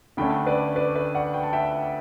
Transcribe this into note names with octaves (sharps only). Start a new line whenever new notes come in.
D2 D3 A3 C#4 G5 B5
B4 D5
B4 D5
B4
D5 F#5
G5
A5
E5 G5